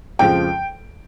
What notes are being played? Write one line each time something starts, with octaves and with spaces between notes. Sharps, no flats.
F2 C#3 F3 G#3 G5